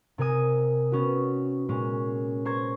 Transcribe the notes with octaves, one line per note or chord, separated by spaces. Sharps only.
C3 A#4 G#5 D#6
B3 C#4 F#4
A#2 G#3 C#4
C5 A#5 C#6 G#6 A#6